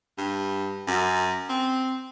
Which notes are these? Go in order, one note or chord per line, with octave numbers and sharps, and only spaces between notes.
G2
F#2
C4